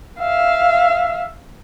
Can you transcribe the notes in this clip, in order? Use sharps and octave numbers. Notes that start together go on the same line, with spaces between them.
E5 F5